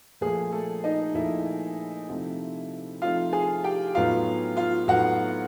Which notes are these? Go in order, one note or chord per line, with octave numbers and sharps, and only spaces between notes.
A#2 F3 A3 G#4
A3 A4
D#4 D#5
A#2 F3 A3 E4 E5
C3 F3 A3 C4 D#4
C3 F3 A3 C4 D#4 F4 F5
G#4 G#5
G4 G5
A2 F#3 B3 D#4 F4 F5
F4 F5
A2 F#3 B3 D#4 F#4 F#5